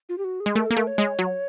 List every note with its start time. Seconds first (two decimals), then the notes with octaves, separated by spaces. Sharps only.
0.09 F4
0.18 G4
0.24 F#4
0.40 G#4
0.46 G#3
0.56 A3 A#4
0.66 A#3 A4
0.76 A3 A#4
0.87 C#5
0.98 G#3
1.19 F#3